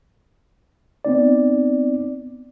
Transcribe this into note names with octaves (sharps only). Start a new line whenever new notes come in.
B3 C4 D#4 D5